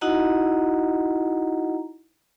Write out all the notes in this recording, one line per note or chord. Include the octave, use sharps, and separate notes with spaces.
D#4 E4 F#4 D#5 F#5 A#5